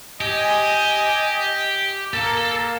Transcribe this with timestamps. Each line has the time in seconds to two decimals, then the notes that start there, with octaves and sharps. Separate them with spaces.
0.21 G4 D#5 G#5
2.13 A#3 A4 A5